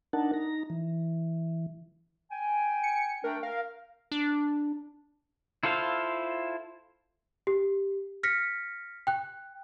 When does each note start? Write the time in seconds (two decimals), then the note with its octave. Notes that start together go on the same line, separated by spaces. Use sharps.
0.13 D4 D#4 A#4 F#5 A5
0.33 D#4 A#5
0.70 E3
2.31 G5 G#5
2.83 C#7
3.24 A3 D4 A#4 G5
3.43 A#4 F5
4.12 D4
5.63 E4 F4 A4 C5 F5
7.47 G4
8.23 F6 A#6 B6 C#7
9.07 G5 F#6